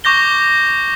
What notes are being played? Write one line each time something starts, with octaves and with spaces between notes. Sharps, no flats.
C#6 D6 G6 A#6 G7